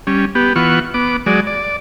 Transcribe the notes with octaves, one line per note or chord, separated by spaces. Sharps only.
G3 C#4
B3 G4
E3 B3 F4 F#5 C#6
B3 D6
F#3 G#3 D5
D5